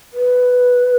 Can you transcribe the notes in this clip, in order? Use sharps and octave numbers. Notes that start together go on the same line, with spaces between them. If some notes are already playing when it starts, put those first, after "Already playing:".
B4